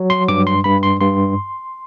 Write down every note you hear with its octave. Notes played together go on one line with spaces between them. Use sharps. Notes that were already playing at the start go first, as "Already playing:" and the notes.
Already playing: F#3
C6
G2 D6
C6
G2 B5
C6
G2 C6